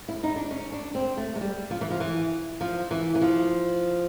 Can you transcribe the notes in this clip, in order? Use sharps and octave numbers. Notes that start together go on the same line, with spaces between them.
E4
D#4
D4
C#4
D4
C4
A3
G#3
G3
F3
E3
F3
E3
F3
E3
E3
F3